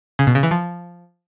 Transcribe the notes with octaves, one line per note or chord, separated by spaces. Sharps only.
C#3
B2
C#3
E3
F3